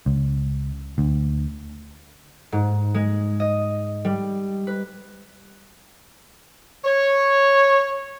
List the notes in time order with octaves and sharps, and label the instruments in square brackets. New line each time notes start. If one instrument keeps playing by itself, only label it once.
[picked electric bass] C#2
D2
[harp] G#2
G#3
D#5
G3
B4
[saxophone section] C#5